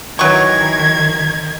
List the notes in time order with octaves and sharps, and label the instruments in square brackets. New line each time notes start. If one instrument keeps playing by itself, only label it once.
[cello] D#3 [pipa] E3 F#3 C#6 [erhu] G#6